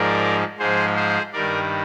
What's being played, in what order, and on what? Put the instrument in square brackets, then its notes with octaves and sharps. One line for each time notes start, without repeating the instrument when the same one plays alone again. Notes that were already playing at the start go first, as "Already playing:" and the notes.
Already playing: [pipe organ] G#2 F3 G#3 A#4 D5
G#2 F3 G#3 G#4 C5
G#4 C5
G2 D#3 G3 A#4 D5